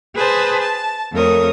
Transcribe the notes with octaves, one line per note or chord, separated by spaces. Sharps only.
G#4 B4 C5 G#5 A5
A5
F2 A3 A#4 C#5 D#6